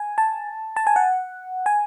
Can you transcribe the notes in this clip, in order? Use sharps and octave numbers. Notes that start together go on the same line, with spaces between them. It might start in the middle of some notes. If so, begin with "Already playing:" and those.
Already playing: G#5
A5
A5
G#5
F#5
G#5